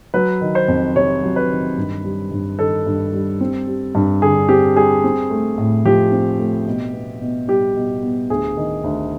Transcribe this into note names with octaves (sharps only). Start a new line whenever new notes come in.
F#3 B4
D#3
C5
F2
C3 C#5
F#3
B4
D#3
G2
G3
G2
D#3 A4
G2
G3
C4
G3
G2
D3 G#4
C4 G4
G3 G#4
C4
A3
A2
F3 G4
C4
A3
B2
B3
B2
G3 G4
B2
B3
D2 G#4
D#3
D2